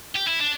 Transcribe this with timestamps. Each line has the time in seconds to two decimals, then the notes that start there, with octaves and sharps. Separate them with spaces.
0.16 G4
0.28 E4
0.40 D4